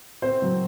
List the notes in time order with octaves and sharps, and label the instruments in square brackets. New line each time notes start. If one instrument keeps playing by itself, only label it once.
[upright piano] C4 C5
F#3